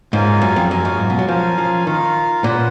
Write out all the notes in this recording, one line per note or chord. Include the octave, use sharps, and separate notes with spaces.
G#2 C#4 F4 A#4 F5 G#5
F#2
F2
F#2 A#3 F4 A#4 F5 G#5
F#2
G#2
B2
F#3
F3 C#4 F4 A#4 F5 G#5
F3
D#3 F4 A#4 F5
A#2 C#4 F4 B4 F#5